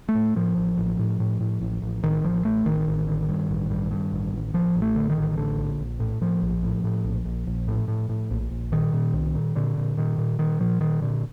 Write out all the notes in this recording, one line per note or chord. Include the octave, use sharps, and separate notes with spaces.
A3
A2
A2 F3
A1
A1
A2
A2
A2
A1
A1
A1 D#3
A1 F3
A1 A3
A1 D#3
A1
D3
G2
A1
G2
G2
A1
A1
A1 F3
A1
A3
D3
D#3
A1
A2 D3
A#1
A#1
A2
A2 F3
A#1
A2
A2
A#1
A#1
A#1
A2
A2
A2
A#1
A#1
A#2 D#3
A#2
C2
A#2
A#2 D3
A#2
A#2 D#3
A#2
A#2 D#3
A#2 F3
A#2 D#3
A#2 D3